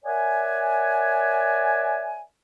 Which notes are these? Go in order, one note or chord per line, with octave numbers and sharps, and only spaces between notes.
A#4 C#5 D5 E5 F#5 G#5